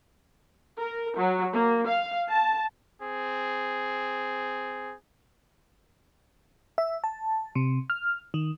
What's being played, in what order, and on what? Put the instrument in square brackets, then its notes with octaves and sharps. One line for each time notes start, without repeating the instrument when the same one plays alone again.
[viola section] A#4
F#3
A#3
F5
A5
[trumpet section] C4 G#4
[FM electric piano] E5
A5
C3
F6
D#3